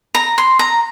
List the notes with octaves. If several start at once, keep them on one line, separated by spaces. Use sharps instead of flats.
A#5
C6
A#5